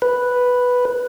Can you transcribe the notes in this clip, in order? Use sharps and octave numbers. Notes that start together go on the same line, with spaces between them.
B4